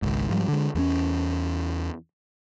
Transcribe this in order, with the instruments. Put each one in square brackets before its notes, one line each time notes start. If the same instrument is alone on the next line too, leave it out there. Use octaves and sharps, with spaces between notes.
[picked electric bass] G#1 C#2 G#2
G#2 F3 G3
D3 G#3
E2 A3 C#4